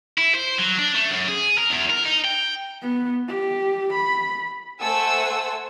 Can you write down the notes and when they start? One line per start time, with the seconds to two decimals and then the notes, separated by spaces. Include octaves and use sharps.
0.18 E4
0.35 C5
0.59 F#3
0.78 D4
0.95 A3
1.10 F#2
1.28 G#4
1.58 A#4
1.70 E2
1.90 A#4
2.05 D#4
2.25 G5
2.82 B3
3.28 G4
3.93 B5
4.82 A3 A4 C5 F#5 G#5 E6